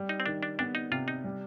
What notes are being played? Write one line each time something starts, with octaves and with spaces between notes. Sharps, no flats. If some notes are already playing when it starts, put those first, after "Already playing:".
Already playing: G3
D#4
C4
D#3 D4
D4
B3 D4
D#4
C3 F4
D#4
G3